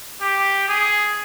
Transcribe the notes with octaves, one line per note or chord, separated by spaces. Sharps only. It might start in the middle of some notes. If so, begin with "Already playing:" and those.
G4
G#4